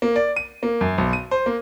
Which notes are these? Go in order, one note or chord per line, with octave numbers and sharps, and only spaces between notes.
A#3
D5
D#7
A#3
F#2
B1
D#7
C5
A#3